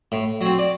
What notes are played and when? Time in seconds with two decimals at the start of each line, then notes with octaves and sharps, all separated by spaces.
0.12 A2
0.41 F#3 C4
0.59 D5